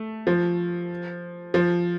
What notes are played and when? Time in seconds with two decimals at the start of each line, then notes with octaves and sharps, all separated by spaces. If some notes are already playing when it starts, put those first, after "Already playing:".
Already playing: A3
0.27 F3
1.54 F3